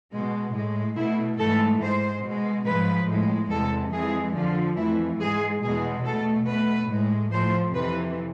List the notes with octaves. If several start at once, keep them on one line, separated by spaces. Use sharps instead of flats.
B2 G#3
A2 G#3
B2 A3 E4
G#2 E3 A3 A4
G#2 G#3 C5
B2 G#3
G#2 F3 G#3 B4
A2 G#3
E2 C3 G#3 A4
F2 E3 G#3 G#4
F2 D3 F3 F4
F2 E3 A3 E4
G#2 G#3 G#4
E2 B2 G#3 G#4
B2 A3 A4
B2 A3 B4
A2 G#3
A2 F3 A3 C5
F2 C3 E3 B4